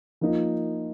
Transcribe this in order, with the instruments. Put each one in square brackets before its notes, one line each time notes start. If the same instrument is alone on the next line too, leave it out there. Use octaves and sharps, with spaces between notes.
[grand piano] F3 A#3 D#4